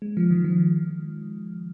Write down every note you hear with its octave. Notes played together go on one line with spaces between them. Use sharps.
G#3
F3
D#3
F3